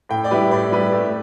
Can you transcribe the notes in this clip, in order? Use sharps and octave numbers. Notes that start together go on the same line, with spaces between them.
A2 G5
D5
G3 E4 G4 B4
A2 D5
G3 E4 G4 B4
A3